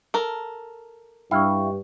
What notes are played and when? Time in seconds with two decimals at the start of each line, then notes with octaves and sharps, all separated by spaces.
0.14 A4 A#4
1.31 G2 E4 F5 G5 C#6